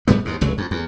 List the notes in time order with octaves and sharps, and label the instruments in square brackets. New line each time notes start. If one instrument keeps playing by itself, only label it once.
[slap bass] G#2 G3 B3
D#2 G#2
F1 C#2 F#3
F2
E2